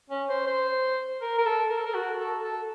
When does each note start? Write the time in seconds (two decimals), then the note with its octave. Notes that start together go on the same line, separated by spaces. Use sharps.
0.10 C#4
0.29 C5
0.47 C5
1.21 A#4
1.38 A#4
1.46 A4
1.69 A#4
1.77 A4
1.86 A#4
1.94 F#4
2.19 A4
2.43 A4